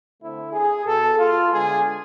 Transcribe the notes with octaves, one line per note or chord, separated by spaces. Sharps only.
D3 A3 C4 E4
G#4
B2 B3 A4
F4
D3 G#3 B3 G#4